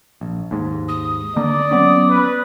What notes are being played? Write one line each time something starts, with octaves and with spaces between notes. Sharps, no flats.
A#1
D#2 G#2
D#6
D3 A#3 D5
F#3 B3 C#4
B4